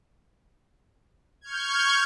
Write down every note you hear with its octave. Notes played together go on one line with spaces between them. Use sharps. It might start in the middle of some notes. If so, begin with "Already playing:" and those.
C#6 F6 G6 G#6